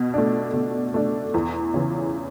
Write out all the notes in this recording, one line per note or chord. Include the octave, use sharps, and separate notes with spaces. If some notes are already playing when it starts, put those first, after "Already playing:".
Already playing: B2
A3 D4
B2
A3 D4
E2
C#3 E3